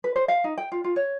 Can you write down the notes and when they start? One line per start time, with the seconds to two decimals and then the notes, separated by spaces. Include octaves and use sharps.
0.04 B4
0.16 C5
0.28 F5
0.44 D#4
0.58 G5
0.72 F4
0.84 F4
0.96 C#5